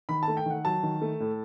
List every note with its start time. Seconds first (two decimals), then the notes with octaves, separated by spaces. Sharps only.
0.09 D#3 B5
0.23 A5
0.28 A3
0.37 G5
0.46 D#3 F#5
0.65 F#3 A5
0.83 D#3
1.01 A3
1.20 A2